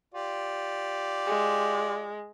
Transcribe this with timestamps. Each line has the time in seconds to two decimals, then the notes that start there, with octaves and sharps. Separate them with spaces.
0.14 F4 G4 D5
1.27 G#3